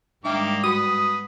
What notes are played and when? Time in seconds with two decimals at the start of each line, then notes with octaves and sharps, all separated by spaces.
0.25 G#2 D#3 G3 A#3 D4 E5 G5 D6
0.63 B3 F#4 D#6